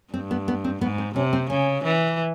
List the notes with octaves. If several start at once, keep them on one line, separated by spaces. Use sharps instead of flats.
G2 C4
B3
B3
C4
G#2 B3
C4
C3 C#4
C4
C#3 C#4
E3